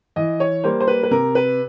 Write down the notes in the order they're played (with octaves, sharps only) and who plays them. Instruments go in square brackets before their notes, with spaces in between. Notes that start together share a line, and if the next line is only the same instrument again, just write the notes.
[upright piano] E3 D#5
C#5
G3 A#3 C5
C5
B4
B4
C3 A#4
B4